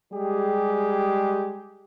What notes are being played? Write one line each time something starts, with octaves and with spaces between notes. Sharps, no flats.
G3 G#3 G4 G#4